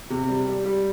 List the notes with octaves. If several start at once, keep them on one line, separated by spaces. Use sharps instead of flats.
C3
G3
G3
G3